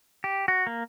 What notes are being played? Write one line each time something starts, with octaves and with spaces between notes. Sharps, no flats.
G4
F#4
A#3